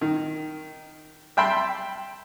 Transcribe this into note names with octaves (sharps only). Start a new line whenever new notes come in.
D#3
E5 G5 A5 B5 C6